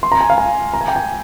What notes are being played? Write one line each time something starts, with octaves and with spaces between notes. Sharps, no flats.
C6
A#5
G#5
F5
G#5
A#5
G#5
G5
G#5